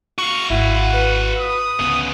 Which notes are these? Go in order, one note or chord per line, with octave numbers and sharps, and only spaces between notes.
F#4 F5 C#6
G#1 E4 F#5
B4
D#6
D2 C#3 B3